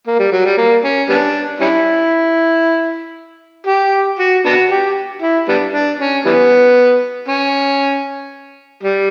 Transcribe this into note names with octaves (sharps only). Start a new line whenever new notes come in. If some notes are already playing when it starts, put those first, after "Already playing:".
A#3
G3
F#3
G3
A#3
C#4
G3 B3 D4
G3 C#4 E4
G4
F#4
B3 D4 F#4
G4
E4
G3 B3 D4
D4
C#4
E3 G3 B3
C#4
G3